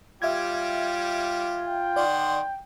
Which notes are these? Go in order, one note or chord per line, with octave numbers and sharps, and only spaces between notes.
G3 F4 G4 E5 G#6
G5
D#3 D5 F#5 C6